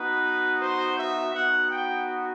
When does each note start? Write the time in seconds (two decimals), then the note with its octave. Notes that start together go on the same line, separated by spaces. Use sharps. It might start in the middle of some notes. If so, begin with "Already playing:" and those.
Already playing: B3 D#4 F#4 B4
0.61 C5
0.97 E5
1.34 B3 D#4 F#4 F#5
1.70 G5